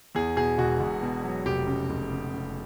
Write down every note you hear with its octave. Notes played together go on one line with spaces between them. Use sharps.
E2 G#4
B2 G#4
E1 F#4
E1
B2
F#3
F1 G4
C#3
F1
C#3
C#3